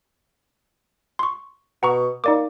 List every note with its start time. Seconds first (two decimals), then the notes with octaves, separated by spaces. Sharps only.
1.19 C6 C#6
1.83 B2 F#5 A#5 C#6
2.24 A#3 D#4 D5 D6